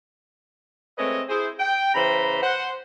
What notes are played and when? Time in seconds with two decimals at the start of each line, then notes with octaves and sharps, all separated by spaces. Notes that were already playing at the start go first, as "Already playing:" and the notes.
0.98 G#3 A3 C4 B4 C#5 D#5
1.29 E4 G#4 C5
1.60 G5
1.95 C#3 E3 C5 A#5 B5
2.43 C5 F#5